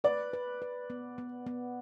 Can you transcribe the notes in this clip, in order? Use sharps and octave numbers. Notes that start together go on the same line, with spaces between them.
B4 D5
B4
B4
B3
B3
B3